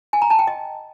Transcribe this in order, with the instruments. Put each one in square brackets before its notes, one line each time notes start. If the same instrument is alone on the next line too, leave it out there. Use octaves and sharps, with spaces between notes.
[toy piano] G#5
A#5
A5
G5
D#5